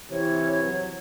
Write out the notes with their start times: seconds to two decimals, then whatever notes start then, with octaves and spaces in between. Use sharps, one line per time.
0.10 C3 E3 C#5
0.64 F#3